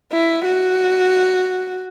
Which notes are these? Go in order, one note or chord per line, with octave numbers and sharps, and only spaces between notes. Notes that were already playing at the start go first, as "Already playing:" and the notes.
E4
F#4